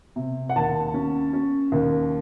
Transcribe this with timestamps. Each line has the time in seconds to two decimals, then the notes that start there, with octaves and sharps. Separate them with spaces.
0.16 C3
0.49 F#5
0.56 D#2 A5
0.94 C#4
1.33 C#4
1.72 D#2